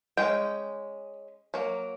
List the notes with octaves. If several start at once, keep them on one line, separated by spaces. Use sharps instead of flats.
G#3 C#4 G5
F#3 A#3